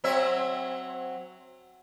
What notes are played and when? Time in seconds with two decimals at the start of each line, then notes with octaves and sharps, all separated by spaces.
0.04 F#3 C4 E5